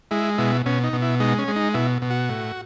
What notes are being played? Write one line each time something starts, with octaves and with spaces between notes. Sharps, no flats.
G#3 E4
B2 E4
B2 C#4
D#4
B2
E4
G#3 D#4
C#4
G#3
D#4
B2 E4
B2
F#4
A2